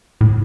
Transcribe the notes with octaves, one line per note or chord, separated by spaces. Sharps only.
A2